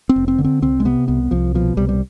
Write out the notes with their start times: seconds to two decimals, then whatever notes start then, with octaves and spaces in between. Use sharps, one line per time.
0.09 C4
0.16 F1
0.28 C4
0.38 D3
0.44 C4
0.62 C2 C4
0.80 G#3
0.85 C3 B3
1.08 C2 B3
1.31 C2 F3
1.55 B2 F3
1.77 C2 G3
1.89 G3